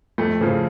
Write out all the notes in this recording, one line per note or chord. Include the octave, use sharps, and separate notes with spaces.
F2 A3
C#3 F3